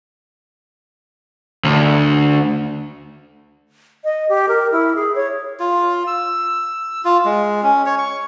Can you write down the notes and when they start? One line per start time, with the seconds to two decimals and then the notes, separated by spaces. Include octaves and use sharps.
1.64 D2
4.04 D#5
4.29 G4
4.48 A#4
4.72 E4
4.95 G#4
5.15 C#5
5.60 F4
6.07 E6
7.05 F4
7.25 G#3
7.63 C#4
7.86 C#5
7.98 C#6